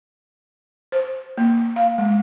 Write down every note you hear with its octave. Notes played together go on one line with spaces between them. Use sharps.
C5
A#3
F5
G#3